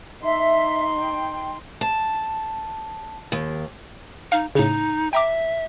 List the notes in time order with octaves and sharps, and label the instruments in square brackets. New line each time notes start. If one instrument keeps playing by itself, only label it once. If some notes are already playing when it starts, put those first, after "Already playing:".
[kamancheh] D#4 C6 [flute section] E5
[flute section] G5
[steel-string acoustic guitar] A5
D#2
[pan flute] D#4 [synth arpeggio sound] F5
[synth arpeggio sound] A2 C#3 [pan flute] D#4
[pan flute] E5 [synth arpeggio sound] G5 A#5 D6